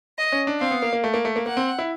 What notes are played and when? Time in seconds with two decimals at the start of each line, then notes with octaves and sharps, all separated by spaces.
0.18 D#5
0.32 C#4
0.47 D4
0.60 C4 F5
0.71 B3
0.82 A#3
0.93 A#3
1.04 A3
1.14 A#3
1.25 A3
1.36 A#3
1.46 A#3 F#5
1.57 C4
1.79 E4